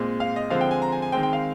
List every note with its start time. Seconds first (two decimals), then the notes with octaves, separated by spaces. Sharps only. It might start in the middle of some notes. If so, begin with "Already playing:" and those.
Already playing: A#2 G#3 C4
0.20 F5
0.36 D#5
0.50 D3 F3 G#3 C4 F5
0.61 G5
0.71 G#5
0.82 A#5
0.92 G#5
1.02 G#5
1.12 D#3 G#3 C4 G5
1.23 G5
1.33 F5